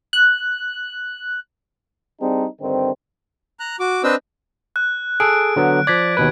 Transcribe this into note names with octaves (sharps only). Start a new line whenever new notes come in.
F#6
G3 C4 D4 D#4 G#4
G2 D3 D#3 C4
A#5 F#6
F#4 D6
C4 D4 B4 C5 D#5 E6
F#6
G#4 A4 D7
D3 F#3 B3
F3 D5 G#6 B6
D#2 B2 B4